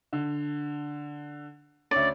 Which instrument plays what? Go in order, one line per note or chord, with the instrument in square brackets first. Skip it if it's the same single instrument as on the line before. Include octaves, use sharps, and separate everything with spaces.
[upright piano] D3
[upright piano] D2 C#4 [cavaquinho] D5